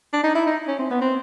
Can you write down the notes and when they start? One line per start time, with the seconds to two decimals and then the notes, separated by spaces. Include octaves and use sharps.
0.13 D4
0.24 D#4
0.35 E4
0.47 D#4
0.68 C#4
0.79 C4
0.90 B3
1.01 C4